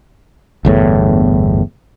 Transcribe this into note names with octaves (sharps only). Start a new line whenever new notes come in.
G1 E2 A2